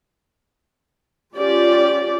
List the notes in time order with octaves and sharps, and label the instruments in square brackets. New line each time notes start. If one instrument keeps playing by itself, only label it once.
[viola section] C#4 F4 G4 D5